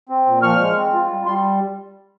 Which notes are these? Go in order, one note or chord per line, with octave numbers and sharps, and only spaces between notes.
C4
A#2
F3 C#6 F6
G#3
C4
F4
G3
G3 C6